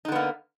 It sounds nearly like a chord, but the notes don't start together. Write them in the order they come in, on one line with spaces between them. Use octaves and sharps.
D#4 D3 B3 A#3